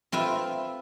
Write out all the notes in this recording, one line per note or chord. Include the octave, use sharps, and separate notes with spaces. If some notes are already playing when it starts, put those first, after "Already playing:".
C4 F4 B4 E5